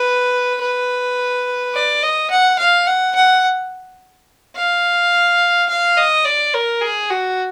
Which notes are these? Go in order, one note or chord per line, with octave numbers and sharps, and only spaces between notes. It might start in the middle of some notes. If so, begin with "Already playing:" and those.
Already playing: B4
B4
D5
D#5
F#5
F5
F#5
F#5
F5
F5
D#5
D5
A#4
G#4
F#4